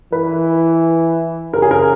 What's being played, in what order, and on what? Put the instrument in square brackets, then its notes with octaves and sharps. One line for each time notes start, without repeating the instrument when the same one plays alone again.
[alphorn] E3 [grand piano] B4
[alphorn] C#3 [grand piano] A#4
[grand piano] G#4
A#4